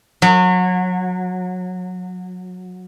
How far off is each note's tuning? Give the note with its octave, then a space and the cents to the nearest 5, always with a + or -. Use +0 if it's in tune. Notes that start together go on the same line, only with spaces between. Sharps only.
F#3 -25